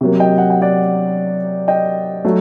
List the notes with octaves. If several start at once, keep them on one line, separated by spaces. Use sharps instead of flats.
C3 F#3 A#3
D#5 G5
F#5
G5
D5 F#5
D#5 G5
F#3 A3